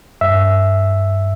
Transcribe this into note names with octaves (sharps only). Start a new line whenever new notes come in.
G2 E5